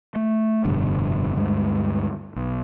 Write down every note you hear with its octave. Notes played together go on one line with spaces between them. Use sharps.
A3
F1 G2 B2 D3
D2 G2 F#3 G#3
B1